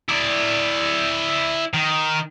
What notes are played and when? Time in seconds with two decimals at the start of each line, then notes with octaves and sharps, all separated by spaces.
0.09 E4 D5
1.74 D#3